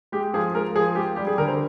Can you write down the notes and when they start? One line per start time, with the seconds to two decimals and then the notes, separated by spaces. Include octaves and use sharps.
0.12 G#3 G4
0.34 F3 G#4
0.55 G#3 A#4
0.76 F3 G#4
0.96 G#3 G4
1.16 G3 G4
1.27 G#4
1.38 D3 A#4
1.48 C5